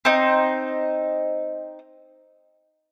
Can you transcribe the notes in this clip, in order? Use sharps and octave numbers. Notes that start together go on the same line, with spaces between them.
C4 D#4